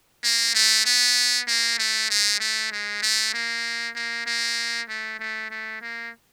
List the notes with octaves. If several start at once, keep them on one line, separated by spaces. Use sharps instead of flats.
A#3
A3
B3
A#3
A3
G#3
A3
G#3
A3
A#3
A#3
A#3
A3
A3
A3
A#3